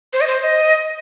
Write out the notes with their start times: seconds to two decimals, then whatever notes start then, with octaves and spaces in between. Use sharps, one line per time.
0.13 C5
0.21 D#5
0.27 C5
0.43 D#5